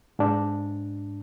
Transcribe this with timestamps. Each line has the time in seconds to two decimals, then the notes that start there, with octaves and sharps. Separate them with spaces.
0.19 G#2 D4